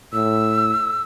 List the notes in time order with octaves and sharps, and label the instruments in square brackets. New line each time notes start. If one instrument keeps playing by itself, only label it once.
[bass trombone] A2 [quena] E6